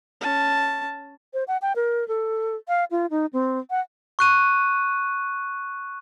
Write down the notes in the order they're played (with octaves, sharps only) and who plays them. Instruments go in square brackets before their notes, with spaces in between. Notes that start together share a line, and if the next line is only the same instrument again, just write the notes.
[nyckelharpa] C#4 A5
[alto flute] C5
F#5
G5
A#4
A4
F5
F4
D#4
C4
F#5
[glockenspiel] C#6 F#6 D#7